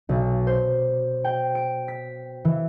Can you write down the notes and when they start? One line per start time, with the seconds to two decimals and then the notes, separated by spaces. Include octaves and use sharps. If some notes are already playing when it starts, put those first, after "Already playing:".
0.09 B1
0.47 C5
1.24 G5
1.55 D7
1.88 B6
2.45 E3